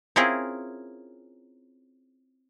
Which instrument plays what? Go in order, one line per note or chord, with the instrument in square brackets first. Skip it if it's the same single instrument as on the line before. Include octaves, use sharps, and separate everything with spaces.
[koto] C4 C#4 E4 F4 G#4 A#4